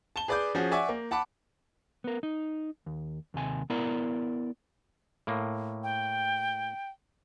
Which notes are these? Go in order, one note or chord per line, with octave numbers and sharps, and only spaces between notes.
A5 E7 G7
G#4 B4 D5 B5 D6 G6
F3 C#4 F#4 G#4
D5 E5 F#5 G#5 C#6 D6
A#3
F#5 A5 B5 D6
B3 A#4
D#4
D#2
D#2 C3 G#5
B3 E4 A#4 D5 A#5
A2 A#3
G5